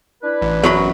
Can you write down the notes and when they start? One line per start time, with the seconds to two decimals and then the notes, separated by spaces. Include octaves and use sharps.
0.23 D4 E4 B4
0.42 A1
0.63 F#2 F#3 B5